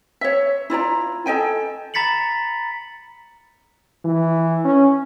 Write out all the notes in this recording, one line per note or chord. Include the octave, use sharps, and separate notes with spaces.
C#5 E5
E4 F4 D5 A#5
A4 D#5 G5 G#5
A#5 B5 A6 B6 C#7 F#7
E3
C#4